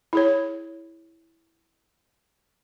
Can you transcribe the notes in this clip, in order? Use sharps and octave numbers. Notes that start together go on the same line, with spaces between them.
E4 G#4 C#5